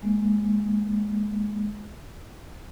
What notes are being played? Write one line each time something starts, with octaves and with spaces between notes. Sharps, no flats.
G#3 A#3